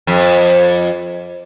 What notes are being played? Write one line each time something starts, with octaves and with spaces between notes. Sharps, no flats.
F2